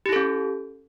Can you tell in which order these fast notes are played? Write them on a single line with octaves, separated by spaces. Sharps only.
G4 E4 A4 C#4